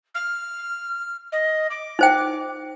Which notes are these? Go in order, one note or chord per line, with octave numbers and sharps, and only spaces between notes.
F6
D#5
D6
D#4 C5 G5